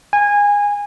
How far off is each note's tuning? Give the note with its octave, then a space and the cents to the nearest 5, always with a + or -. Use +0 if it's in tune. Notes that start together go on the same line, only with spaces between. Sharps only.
G#5 -20